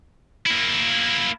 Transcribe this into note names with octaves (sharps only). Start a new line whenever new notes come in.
A#3 E4